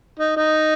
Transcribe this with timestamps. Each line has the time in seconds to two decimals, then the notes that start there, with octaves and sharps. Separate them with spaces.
0.19 D#4
0.36 D#4